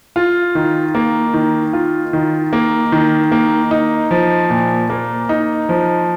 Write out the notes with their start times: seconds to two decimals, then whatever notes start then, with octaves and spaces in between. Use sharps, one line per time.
0.16 F4
0.55 D#3
0.95 A#3
1.34 D#3
1.73 F4
2.13 D#3
2.53 A#3
2.92 D#3
3.32 A#3
3.71 D#4
4.11 F3
4.50 A#2
4.90 A#3
5.29 D#4
5.69 F3